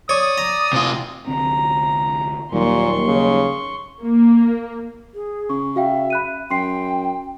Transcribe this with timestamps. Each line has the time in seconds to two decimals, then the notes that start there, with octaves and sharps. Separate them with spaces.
0.09 C#5 D5 D#6
0.38 A#5
0.73 C3 F4
1.27 C2 D3 C4 A#5
2.53 D#2 A#2 F#3 G3 C6 C#6
3.08 C#3
4.03 A#3
5.14 G#4
5.49 C#3 C#6
5.76 F#4 E5 F5 G5
6.10 B5 F#6 D#7
6.51 F#2 G5 C6 C7